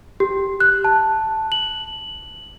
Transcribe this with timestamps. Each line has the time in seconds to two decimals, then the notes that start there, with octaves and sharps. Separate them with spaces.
0.20 G4
0.60 F#6
0.85 A5
1.52 F#7